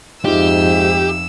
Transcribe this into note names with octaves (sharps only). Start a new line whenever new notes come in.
F2 G#2 D#4 F4 G4 E5 E6